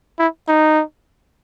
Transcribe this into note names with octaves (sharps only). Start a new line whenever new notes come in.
E4
D#4